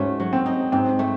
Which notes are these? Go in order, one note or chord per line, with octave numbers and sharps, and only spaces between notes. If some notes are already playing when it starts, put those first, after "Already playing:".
Already playing: G#2 A3 C#4 F#4
F#3
C4
D#4
G#2 C4
A3